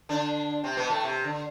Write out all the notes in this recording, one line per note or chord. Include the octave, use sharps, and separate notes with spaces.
D3 D4
C3 C4
B2 B3
A2 A3
C3
D3